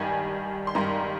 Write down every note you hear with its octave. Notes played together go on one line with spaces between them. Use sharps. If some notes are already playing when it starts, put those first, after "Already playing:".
Already playing: G2 D#3 G3 G#5
C6
G2 D#3 G3 A#5